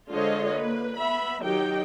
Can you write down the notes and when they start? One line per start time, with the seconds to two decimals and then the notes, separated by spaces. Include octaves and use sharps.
0.10 D3 G#3 F4 C5 C#5 D#5
0.50 A#3 B4
0.97 B3 E5 B5
1.42 D#3 F#3 D#4 G4 G5